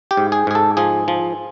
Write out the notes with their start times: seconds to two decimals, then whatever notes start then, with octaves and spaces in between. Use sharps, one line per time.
0.11 G4
0.17 G#2
0.32 G#4
0.47 G#2 G#4
0.55 A4
0.77 F3 G#4
1.08 F3